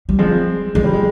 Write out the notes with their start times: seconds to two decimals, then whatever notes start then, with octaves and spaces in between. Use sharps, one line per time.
0.09 G3
0.19 F3 G#3 C4
0.75 F3 G#3
0.84 G3
0.93 G#3